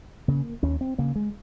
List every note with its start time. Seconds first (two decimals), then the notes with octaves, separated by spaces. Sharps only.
0.28 C#3 A#3
0.63 D#2 C#4
0.81 C4
0.98 C#3 A#3
1.16 G#3